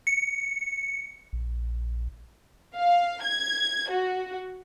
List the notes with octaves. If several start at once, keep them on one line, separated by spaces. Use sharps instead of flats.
C#7
A#1
F5
G#6
F#4